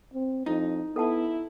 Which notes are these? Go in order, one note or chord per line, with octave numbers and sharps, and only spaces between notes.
C4
F2 D#4 E4
B3 E4 A4 F#5 A5